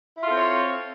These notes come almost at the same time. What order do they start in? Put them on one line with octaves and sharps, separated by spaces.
E4 F4 A4 C4 C#5